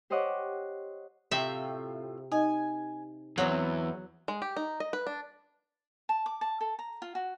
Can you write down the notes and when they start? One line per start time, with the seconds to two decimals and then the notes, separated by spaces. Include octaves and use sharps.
0.10 G4 C5 C#5 D#5 F#5 D6
1.31 A2 C3 F4 E5 G5
2.32 D#4 D#5 G#5
3.38 E2 F#3 C4 F#4
4.28 G#3
4.42 G4
4.57 D#4
4.80 D#5
4.93 B4
5.07 D4
6.09 A5
6.26 D6
6.41 A5
6.61 A4
6.79 A#5
7.02 F4
7.15 F#4